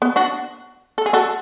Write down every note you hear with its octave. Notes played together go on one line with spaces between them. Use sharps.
B3
D4 F#4
A4
G#4
F#4 A4